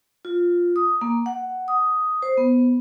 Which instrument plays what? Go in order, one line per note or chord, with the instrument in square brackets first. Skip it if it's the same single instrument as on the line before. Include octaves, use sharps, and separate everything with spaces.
[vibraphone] F4
D#6
A#3
F#5
D#6
C5
B3